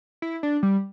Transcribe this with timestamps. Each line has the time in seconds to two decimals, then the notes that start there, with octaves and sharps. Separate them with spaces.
0.22 E4
0.43 D4
0.63 G3